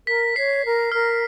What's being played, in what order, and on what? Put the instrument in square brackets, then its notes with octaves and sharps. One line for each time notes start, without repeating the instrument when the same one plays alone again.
[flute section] A#4 [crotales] B6
[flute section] C#5 [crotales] C7
[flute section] A#4
[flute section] A#4 [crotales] F6